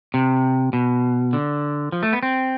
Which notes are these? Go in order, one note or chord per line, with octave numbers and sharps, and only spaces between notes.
C3
B2
D3
F3
A3
B3
C4